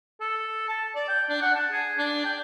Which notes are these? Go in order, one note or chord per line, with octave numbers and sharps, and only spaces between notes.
A4
A5
D5
G5
D4
F#5
A5
G#4
D4
G5